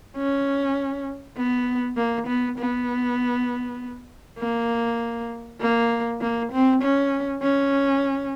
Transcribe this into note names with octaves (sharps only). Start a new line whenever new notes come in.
C#4
B3
A#3
B3
B3
A#3
A#3
A#3
C4
C#4
C#4